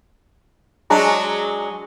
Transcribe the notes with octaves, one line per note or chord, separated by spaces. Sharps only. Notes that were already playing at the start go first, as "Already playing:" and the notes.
F#3 G#3 D4 A#5